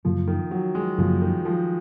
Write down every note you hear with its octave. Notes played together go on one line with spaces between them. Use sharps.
F#2 C#3 F3 F#3 A#3
D#3
F#3
G#3
F#2 C#3 F3 F#3 A#3
D#3
F3